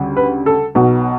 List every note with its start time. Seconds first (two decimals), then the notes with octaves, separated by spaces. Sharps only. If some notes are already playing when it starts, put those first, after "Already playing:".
Already playing: D2 C#3 G3
0.17 B4
0.46 A4
0.75 B1 B2 F#3